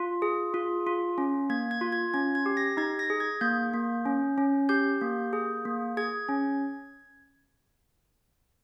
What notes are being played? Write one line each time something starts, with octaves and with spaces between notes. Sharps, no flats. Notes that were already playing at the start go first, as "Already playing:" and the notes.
Already playing: F4
G#4
F4
F4
C#4
A#3 G#6
G#6
F4
G#6
C#4 G#6
G#6
G4
A#6
D#4 G#6
A#6
G#4
G#6
A#3 G6
A#3
C#4
C#4
G4 G6
A#3
G#4
A#3
G#4 G#6
C#4